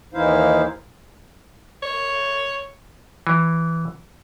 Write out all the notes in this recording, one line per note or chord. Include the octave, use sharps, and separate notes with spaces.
D#2 E3 D#4 E4 C5 F5
C#5
E3